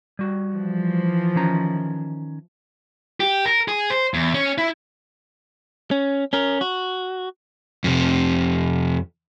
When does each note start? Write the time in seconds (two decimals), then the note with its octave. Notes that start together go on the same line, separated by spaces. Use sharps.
0.19 G3 F#4
0.49 E3 F3
1.35 D#3 C#4 A#5
3.20 G4
3.45 A#4
3.68 G#4
3.90 C5
4.14 E2
4.34 C#4
4.58 E4
5.91 C#4
6.33 C#4 A#4
6.61 F#4
7.84 F2 C3